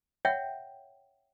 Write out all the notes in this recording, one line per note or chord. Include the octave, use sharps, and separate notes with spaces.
C#5 E5 F#5 G5